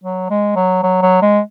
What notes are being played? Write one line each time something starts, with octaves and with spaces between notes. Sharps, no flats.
F#3
G#3
F#3
F#3
F#3
G#3